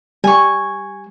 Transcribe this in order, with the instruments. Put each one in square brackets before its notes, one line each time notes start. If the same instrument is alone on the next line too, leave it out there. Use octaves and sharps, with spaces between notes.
[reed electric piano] G3 [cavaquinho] G#5 C#6